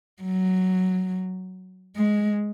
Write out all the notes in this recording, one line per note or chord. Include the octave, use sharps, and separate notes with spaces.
F#3
G#3